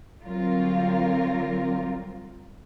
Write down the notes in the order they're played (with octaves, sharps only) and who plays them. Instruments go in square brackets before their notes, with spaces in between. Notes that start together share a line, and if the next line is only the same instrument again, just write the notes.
[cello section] D3 F#3 G3 C4 F4 A#4